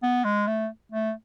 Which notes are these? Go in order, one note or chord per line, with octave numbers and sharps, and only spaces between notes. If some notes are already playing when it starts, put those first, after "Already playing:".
B3
G#3
A3
A3